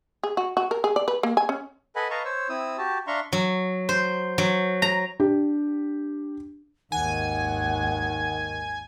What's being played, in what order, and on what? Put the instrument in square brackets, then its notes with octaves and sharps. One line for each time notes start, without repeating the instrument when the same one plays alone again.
[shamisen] G#4
F#4
F#4
A#4
G#4
D5
B4
A#3
G#5
C#4
[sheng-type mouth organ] A4 B4 D#5 F#5 G#5 B5
B4 D#5 F5 A5 A#5 C#6
C5 C#5 E6
C4 E4 D#6 E6
F#4 G4 A5
D4 E5 F5 A#5 C6 C#6
[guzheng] F#3
C5
F#3
A#5
[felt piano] D4 G4
[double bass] G#1 D#2 [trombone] D#3 [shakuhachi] F#5 [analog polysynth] G#5